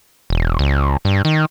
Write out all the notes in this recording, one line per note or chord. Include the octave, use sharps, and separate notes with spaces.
E1
C#2
G2
D#3